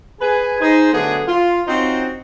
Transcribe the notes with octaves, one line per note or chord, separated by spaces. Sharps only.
G#4 B4 G#5
D#4 G#4 C5
D3 F#3 A3 B3 D4 G#4
F4
C4 C#4 D#4 F4 F#4 C5